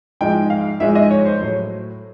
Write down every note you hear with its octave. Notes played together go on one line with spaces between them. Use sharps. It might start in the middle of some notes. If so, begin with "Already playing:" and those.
G#2 F3 G#3 G5
F5
G#2 F3 G#3 E5
D#5
C#5
C5
A2 F#3 A3